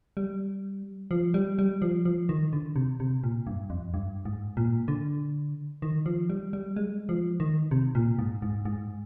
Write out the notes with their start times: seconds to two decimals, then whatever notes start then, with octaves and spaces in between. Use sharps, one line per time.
0.17 G3
1.11 F3
1.34 G3
1.59 G3
1.82 F3
2.05 F3
2.29 D#3
2.53 D3
2.76 C3
3.00 C3
3.24 A#2
3.47 G2
3.70 F2
3.94 G2
4.25 G#2
4.57 A#2
4.88 D3
5.82 D#3
6.06 F3
6.30 G3
6.53 G3
6.76 G#3
7.09 F3
7.40 D#3
7.71 C3
7.95 A#2
8.19 G#2
8.42 G#2
8.65 G#2